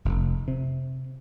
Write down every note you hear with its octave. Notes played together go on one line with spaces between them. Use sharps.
F1
C3